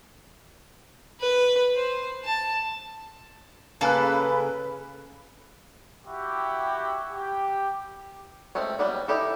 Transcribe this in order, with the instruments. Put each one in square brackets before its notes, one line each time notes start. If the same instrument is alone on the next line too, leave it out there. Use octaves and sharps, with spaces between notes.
[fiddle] B4
C5
A5
[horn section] C#3 [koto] A#3 A4 [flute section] B4 [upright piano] F5 G#5 F#6
[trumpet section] E4 F#4 G4
G4
[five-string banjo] G#3 A3 C4 C#4
F#3 G3 A#3 B3
D#4 E4 G4 A4